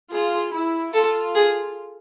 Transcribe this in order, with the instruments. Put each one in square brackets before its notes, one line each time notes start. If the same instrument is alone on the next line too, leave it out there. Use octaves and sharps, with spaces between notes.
[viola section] F4 [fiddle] G#4
[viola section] E4
[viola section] F4 [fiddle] A4
[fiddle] G#4